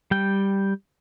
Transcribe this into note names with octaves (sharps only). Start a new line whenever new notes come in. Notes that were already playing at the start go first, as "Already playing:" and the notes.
G3 G5